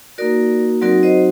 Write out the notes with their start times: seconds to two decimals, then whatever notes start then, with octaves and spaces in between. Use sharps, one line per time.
0.18 A#3 D#4 F#4 A#4 D5
0.81 F#3 C4 D#4 F#4 A#4 D5
1.03 C5 D#5